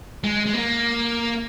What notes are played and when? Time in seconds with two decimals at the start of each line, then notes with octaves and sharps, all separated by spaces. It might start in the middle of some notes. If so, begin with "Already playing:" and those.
0.24 G#3
0.46 G#3
0.54 A#3